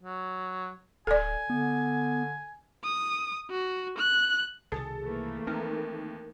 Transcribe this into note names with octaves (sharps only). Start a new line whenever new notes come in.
F#3
D1 A4 D5 G#5
D3 B3
D#6
F#4
F#6
C2 B2 D#3 G#4 A4
E3 A3 A#3
D#2 C4 A#4